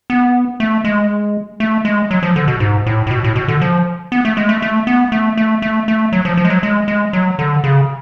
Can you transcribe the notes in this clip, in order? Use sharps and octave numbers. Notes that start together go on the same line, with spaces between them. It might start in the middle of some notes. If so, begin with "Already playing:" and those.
B3
A3
G#3
A3
G#3
F#3
F3
D3
B2
G#2
A2
A2
B2
A2
B2
D3
F3
B3
A3
G#3
A3
A3
B3
A3
A3
A3
A3
F#3
F3
F3
G#3
F#3
G#3
G#3
F#3
D3
C#3